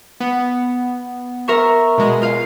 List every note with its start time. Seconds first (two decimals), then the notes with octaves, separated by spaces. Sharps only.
0.20 B3
1.48 A#4 E5 C#6
1.98 B2 G#3
2.22 F4 F5